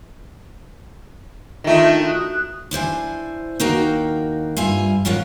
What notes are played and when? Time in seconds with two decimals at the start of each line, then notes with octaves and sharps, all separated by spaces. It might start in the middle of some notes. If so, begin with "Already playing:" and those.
1.64 D#3 A3 D4 D#4 F4
2.06 F#4 D#6 F#6
2.71 D4 E4 C5 G#5
3.60 D#2 D#4 F#4 A#4 F5 G5
4.57 G2 F4 E5 G#5
5.05 G#2 F3 C#4 F4 A#4 F#5